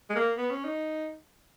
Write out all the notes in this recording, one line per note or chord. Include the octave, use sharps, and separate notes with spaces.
G#3
A#3
B3
C#4
D#4